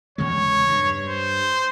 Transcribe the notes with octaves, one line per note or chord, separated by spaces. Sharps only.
E2 C#3 G#3 C#5
G2
C5